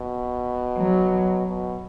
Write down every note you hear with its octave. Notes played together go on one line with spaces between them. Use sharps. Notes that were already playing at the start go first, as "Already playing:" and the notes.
Already playing: B2
F#3
B2